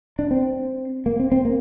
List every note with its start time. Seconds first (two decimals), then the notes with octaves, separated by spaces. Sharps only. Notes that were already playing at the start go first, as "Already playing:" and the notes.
0.19 D4
0.31 C4
1.06 A#3
1.20 C4
1.32 C4
1.45 A#3